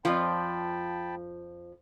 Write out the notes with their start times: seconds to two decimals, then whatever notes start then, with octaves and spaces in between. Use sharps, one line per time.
0.05 F2 F3 F4 D5 G5 A5 B5